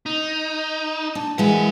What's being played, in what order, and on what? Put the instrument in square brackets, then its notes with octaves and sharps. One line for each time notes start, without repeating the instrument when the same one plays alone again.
[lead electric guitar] D#4
[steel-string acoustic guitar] D4
[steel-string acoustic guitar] E3 G#3 E5 [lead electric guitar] A#4 F#5